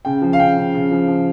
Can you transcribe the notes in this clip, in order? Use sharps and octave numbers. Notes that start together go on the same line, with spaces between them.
C#3 G5
F3
F5
C#3 G5
C#3
C#3
F3
F3